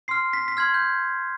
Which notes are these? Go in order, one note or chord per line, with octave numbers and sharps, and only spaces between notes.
C6 F6 C7
B6
B6
C6 F6 G#6
G6